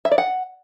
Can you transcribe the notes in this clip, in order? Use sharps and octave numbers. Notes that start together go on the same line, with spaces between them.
E5
D5
F#5